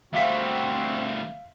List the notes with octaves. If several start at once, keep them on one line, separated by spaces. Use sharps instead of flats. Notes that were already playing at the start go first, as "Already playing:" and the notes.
D2 G3 C4 F#4 E5 F5 B6